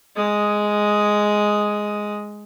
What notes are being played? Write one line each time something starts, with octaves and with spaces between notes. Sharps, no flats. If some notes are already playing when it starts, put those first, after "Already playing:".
G#3 D#6